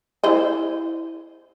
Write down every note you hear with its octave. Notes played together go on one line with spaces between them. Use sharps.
E4 C5 D#5